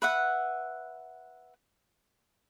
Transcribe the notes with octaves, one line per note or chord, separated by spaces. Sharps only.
B4 E5 F#5